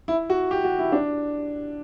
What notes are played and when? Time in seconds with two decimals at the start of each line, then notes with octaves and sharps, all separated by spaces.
0.08 E4
0.30 F#4
0.51 G4
0.64 F#4
0.79 E4
0.92 D4